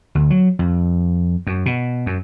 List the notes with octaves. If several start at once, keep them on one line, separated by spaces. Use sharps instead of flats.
D2
F#3
F2
F#2
B2
F#2